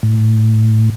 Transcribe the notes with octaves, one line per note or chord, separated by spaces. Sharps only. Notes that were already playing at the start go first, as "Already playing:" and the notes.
A2